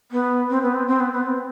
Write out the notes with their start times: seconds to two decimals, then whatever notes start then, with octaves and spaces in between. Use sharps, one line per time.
0.11 B3
0.50 C4
0.63 B3
0.74 C4
0.88 C4
1.00 B3
1.13 B3
1.25 C4